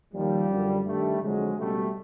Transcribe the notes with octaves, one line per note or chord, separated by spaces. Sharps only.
D#2 D#3 F3 G3
F#2 D3 F3
G2 D#3 G3 A3
F2 D3 F3 F#3 G#3
C#2 B2 G3 A3